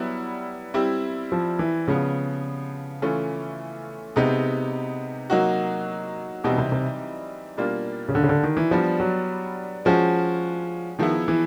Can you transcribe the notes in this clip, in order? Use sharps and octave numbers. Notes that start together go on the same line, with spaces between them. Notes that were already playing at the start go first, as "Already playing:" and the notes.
Already playing: F#3 G3 B3 E4
G3 C4 E4 G4
F3
E3
C#3 F3 G#3 B3
E3 A3 C#4 F4
C3 G#3 B3 D#4 G4
F#3 A#3 D#4 F#4
B2 E3 G3 C4 D#4 G4
C3
C3
B2 G3 A#3 D4 F4
C#3
D3
C#3
D3
D#3
E3
F3 G3 B3 D4
F#3
F3 G#3 C#4 F#4
D#3 F3 G#3 B3 E4
E3